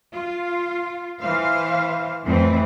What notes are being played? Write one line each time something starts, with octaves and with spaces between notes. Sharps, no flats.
F4
E3 C5 F5
F2 A2 E3 C4